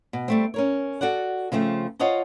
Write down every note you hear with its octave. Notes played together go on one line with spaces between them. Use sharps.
B2
G3 A3 C4
C#4 A#4 C#5
F#4 A4 D5 F#5
C#3 F3 A3 C4
F4 C5 C#5 D#5 F#5 A5